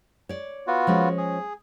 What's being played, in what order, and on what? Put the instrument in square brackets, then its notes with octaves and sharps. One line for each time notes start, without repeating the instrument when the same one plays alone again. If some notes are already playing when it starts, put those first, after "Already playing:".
[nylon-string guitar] C#5 D5
[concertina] B3 F4 F#4
[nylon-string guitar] F3 G#3 C#4
[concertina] G#4